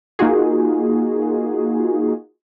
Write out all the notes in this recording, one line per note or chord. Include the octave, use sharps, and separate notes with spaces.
A#3 D#4 F4 F#4 G#4